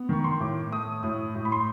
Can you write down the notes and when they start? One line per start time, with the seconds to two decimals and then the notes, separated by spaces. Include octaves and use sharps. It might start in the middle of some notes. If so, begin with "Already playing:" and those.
Already playing: B3
0.09 D#3 C#6
0.24 C6
0.40 A2 D6
0.71 A3 D#6
0.92 D#6
1.03 A2 D#6
1.35 A2
1.45 B5
1.52 C6